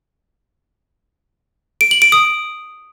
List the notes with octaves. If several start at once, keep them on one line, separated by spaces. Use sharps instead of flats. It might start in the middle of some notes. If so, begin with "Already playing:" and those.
D7
F#7
D7
D#6